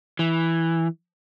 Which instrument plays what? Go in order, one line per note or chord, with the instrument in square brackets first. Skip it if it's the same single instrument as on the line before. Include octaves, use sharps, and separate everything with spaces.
[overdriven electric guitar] E3